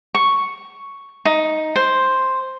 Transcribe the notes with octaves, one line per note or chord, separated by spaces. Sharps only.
C#6
D#4
C5